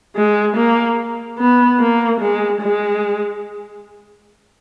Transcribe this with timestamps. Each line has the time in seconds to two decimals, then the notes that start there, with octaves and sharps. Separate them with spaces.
0.16 G#3
0.56 A#3
1.38 B3
1.80 A#3
2.21 G#3
2.61 G#3